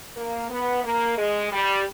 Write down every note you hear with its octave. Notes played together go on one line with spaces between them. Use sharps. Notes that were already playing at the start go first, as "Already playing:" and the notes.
A#3
B3
A#3
G#3
G3